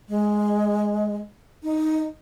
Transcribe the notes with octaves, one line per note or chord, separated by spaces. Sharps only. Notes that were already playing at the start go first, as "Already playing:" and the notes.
G#3
D#4